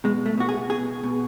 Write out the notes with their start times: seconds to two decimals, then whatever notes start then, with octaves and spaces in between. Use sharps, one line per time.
0.04 B2 G#3
0.26 A3
0.38 B2 F#4
0.49 G#4
0.70 B2 G#4
1.04 B2